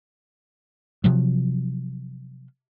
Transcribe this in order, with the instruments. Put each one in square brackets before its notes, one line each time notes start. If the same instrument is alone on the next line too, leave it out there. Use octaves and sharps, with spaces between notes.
[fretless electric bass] C3 F3 F#3